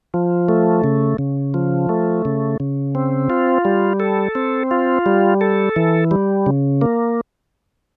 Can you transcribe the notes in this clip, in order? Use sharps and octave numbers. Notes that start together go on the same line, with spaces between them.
F3
A3
C#3
C#3
F3
A3
C#3
C#3
C4
F4
G3
A4
C4
F4
G3
A4
E3
G3
C#3
A#3